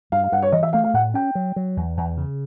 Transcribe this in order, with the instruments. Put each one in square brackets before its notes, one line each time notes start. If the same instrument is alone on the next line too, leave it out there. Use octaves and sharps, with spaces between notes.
[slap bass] G2 [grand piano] F5
[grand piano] F5
[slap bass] G2 [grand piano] F#5
[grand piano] C#5
[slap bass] E3 [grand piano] D#5
[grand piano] E5
[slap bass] A3 [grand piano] F5
[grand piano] F5
[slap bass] A2 [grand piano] F#5
[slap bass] C#4 [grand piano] G5
[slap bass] F#3
F#3
E2
E2
C#3